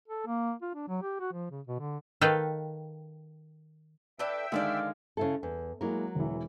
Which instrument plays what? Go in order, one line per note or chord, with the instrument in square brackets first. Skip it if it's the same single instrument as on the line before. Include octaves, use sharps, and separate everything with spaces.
[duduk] A4
A#3
F4
D4
F#3
G4
F#4
F3
C#3
B2
D3
[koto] D#3 A4 B4 F5 G5
[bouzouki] D4 A4 B4 [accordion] E5 G5 E6
[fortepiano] D3 D#3 G#3 [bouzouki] A4 B4 D5 [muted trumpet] F5
[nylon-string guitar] C#3 E4 A4
E2
[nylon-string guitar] F#3 A#4 [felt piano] G#3 A#3 E4
[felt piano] E1 E3